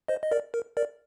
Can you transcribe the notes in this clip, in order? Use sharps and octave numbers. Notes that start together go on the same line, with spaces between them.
C5 D#5
D#5
A#4 D5
A#4
A#4 D5